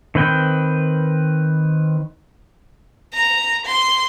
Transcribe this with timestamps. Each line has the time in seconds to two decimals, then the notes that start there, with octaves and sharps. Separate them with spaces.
0.15 D#3 C4 B4 G5
3.14 A#5
3.66 C6